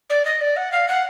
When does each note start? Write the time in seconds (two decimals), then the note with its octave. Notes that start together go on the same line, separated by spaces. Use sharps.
0.09 D5
0.25 D#5
0.40 D5
0.56 F#5
0.71 F5
0.88 F#5